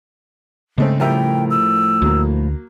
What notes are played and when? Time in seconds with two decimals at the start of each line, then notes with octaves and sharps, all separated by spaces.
0.78 G#2 C#3 A3 C4
1.00 A2 F3 G3 A#4 E5 G5
1.50 E6
2.02 D2 F#3 A#3